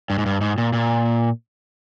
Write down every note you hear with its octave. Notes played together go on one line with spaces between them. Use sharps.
G2
G#2
G2
G#2
A#2
A#2